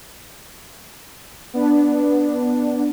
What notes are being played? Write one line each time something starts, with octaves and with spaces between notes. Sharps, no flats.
B3 D4